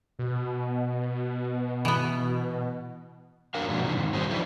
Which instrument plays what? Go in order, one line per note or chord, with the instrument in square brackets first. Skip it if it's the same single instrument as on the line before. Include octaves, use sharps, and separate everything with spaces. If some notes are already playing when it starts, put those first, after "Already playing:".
[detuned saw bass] B2
[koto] E3 B3
[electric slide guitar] E2 F#3 D4 A#4 F5
G#2 B2 F3 A#3 D4
C3 D#3 F3
G#2 D#3
F#3 G3 B3 G#4 C5
D#3 F3 D4 E4 B4